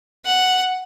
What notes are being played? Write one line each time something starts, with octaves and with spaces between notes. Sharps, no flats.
F#5